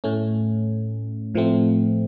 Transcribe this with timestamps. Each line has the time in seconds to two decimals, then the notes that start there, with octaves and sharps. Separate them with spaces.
0.04 A2 A3 C#4
1.35 A2 F3 A3 C4